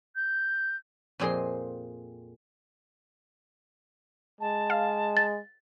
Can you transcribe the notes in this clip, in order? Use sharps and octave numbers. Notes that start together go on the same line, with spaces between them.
G6
F2 A#2 C4 G#4 D#5 C6
G#3 A5
F5
A6